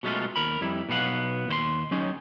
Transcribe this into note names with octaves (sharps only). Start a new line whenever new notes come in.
B2 F#3 G#3 A3 C#4 F4
D#2 A#4 B5
F2 G3 E4
B1 B2 B3 F5 F#5
D#2 C5 C6
F#3 C#4 D#4 G#4